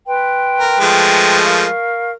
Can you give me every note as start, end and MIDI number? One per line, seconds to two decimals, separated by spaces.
0.07 1.38 71
0.07 1.38 79
0.07 1.38 84
0.60 0.76 70
0.80 1.65 53
0.80 1.65 56
0.80 1.65 57
1.44 2.11 70
1.44 2.11 77
1.44 2.11 85